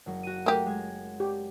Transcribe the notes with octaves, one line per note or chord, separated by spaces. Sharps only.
F#1 F#3
F#4 D#7
A3 A#3 G4
G#3 G#6
G4